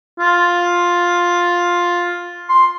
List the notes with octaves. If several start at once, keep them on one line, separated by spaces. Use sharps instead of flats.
F4
C6